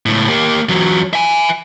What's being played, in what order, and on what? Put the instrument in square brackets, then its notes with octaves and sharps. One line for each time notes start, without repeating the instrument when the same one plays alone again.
[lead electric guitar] C#2 A2
A#3 G4
E2 F#3
E5 G#5